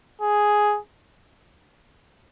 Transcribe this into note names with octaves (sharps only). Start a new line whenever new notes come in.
G#4